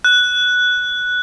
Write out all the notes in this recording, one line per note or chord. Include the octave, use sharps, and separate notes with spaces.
F#6